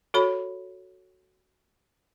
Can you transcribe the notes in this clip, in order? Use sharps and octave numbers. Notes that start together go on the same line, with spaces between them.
F#4 A4 C#5 B5